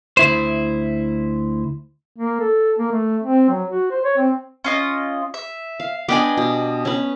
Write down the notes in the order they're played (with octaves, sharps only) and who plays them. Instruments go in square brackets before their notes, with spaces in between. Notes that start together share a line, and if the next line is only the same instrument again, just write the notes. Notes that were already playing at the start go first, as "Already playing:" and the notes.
[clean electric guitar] D2 E4 C5
[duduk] A#3
A4
A#3
A3
C4
F#3
F#4
C5
C#5
C4
[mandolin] C#4 F4 D#5
E5
[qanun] F5
[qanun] B3 D4 B5 [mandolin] G4 D#5 G#5
[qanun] B2
C#4 B4